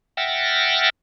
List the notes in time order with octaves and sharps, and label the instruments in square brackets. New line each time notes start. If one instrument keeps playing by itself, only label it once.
[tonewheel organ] E5 F#5 G5 F6 A6 A#6